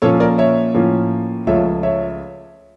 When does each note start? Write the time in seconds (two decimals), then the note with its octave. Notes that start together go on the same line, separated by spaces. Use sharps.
0.02 A#2 F3 A#3 C#4 A4 C#5
0.20 A#4 D5
0.38 C#5 E5
0.74 A2 F3 A#3 C#4
1.47 C#2 C#3 F3 A3 C#5 E5
1.83 C#5 E5